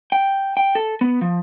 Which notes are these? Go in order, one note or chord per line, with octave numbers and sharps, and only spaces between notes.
G5
G5
A4
B3
F3